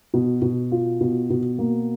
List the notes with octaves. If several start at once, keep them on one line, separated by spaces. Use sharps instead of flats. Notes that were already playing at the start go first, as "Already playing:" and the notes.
B2
B2
F4
B2
B2
A#3